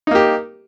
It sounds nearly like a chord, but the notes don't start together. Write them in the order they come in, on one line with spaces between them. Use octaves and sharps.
D#4 A#3 G4